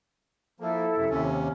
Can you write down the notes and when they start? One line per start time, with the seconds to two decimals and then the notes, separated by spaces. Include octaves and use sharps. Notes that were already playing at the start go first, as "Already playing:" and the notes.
0.60 F3 A#3 E4 A4
0.97 F#2 C3
1.10 D#2 C3 C#4